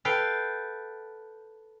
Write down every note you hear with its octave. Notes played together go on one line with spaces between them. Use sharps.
A4 B4 F5 G5